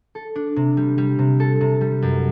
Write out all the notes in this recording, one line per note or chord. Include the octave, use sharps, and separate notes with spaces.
A4
D4
C3
G3
G3
C3
A4
C3
G3
F#2